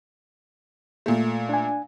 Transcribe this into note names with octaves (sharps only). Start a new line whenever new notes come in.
A#2 A3
D4 G#5